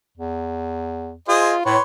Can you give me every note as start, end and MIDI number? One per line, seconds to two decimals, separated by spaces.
0.17 1.14 40
1.28 1.61 65
1.28 1.54 68
1.28 1.54 72
1.28 1.54 75
1.66 1.77 45
1.66 1.82 71
1.66 1.82 73
1.66 1.82 84